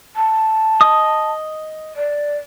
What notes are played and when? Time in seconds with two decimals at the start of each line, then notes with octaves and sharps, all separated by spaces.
0.16 A5
0.81 D#5 D#6
1.96 D5